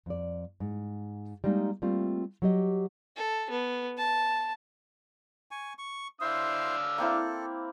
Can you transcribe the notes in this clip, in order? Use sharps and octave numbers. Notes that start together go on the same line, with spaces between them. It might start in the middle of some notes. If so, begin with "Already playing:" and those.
F2 D5
G#2
G3 G#3 A#3 D#4
G3 A3 A#3 C4 F4
F#3 G4 D#5
A4
B3
A5
G#5 C#6
C#6
D4 E4 C5 F5 C6 E6
A#3 C4 E4 A4